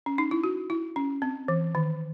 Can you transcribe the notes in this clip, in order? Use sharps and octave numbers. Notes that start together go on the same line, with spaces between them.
C#4
D#4
E4
F#4
E4
C#4
C4
E3
D#3